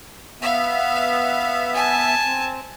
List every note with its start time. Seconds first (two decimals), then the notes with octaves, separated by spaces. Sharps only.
0.42 B3 E5 F5
1.75 G#5 A5
2.26 C4